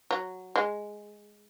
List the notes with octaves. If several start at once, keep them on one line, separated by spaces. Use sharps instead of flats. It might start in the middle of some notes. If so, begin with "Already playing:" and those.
F#3
G#3